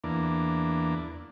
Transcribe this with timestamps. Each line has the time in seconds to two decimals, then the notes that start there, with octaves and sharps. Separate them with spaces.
0.04 E2 A#3 D4